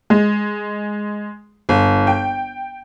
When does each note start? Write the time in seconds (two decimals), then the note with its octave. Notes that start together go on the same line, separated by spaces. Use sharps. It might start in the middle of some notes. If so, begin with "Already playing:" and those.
0.10 G#3
1.69 G1
2.07 G5